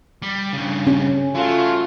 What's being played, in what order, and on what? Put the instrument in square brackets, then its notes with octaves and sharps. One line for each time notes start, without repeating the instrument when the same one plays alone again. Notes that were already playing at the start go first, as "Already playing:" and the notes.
[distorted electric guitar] G3
G2 C#3
[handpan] C#4
[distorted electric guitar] F#3 [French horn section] A3 F4